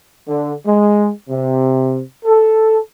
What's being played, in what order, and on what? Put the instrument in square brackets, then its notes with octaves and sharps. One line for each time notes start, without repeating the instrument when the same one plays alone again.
[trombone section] D3
G#3
C3
A4